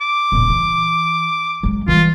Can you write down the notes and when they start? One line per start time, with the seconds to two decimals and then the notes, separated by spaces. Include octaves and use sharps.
0.01 D6
0.32 D#1 A#1
0.49 E3
1.63 F#3 G#3
1.88 E3 G3 F4